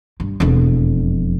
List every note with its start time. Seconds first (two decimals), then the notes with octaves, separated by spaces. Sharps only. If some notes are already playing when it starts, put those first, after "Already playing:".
0.20 G2
0.40 E1 F2